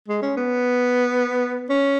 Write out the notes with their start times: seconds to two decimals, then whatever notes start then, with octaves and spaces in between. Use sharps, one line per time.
0.08 G#3
0.22 C#4
0.37 B3
1.70 C#4